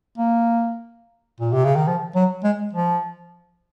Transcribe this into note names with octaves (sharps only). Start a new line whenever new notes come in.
A#3
A#2
C3
C#3
D#3
F3
F#3
G#3
F3